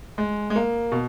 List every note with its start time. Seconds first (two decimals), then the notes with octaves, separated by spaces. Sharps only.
0.18 G#3
0.50 G#3
0.56 A#3
0.92 B2